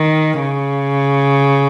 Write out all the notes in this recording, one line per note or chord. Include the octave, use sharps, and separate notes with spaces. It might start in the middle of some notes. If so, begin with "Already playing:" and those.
Already playing: D#3
C#3